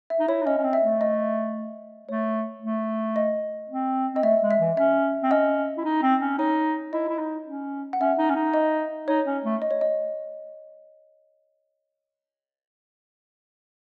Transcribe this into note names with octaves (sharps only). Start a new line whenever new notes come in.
E5
D#4
E4 C#5
D#4
C#4 D#5
C#4
C4
E5
A3
D#5
A3 C#5
A3
D#5
C4
C4 D#5
A3 E5
G#3
E5
E3
C#4 E5
C4
C#4 D#5
E4
D#4
C4
C#4
D#4 C#5
E4 D#5
E4
D#4
C#4
F#5
C#4 E5
D#4
C#4
D#4
D#5
D#4 C#5
C#4
A3
D#5
C#5
D#5